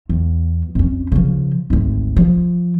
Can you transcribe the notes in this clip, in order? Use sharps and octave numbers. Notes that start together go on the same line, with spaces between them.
E2
F2 C#4
C#3 F3
G#1 D2
F3